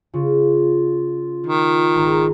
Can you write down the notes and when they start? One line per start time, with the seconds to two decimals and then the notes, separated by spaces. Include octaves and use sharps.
0.14 C#3 F4
1.46 D#3
1.96 G#1 A#5 E7